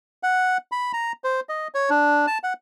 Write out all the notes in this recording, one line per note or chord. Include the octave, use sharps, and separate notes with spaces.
F#5
B5
A#5
C5
D#5
C#5
D4
A5
F#5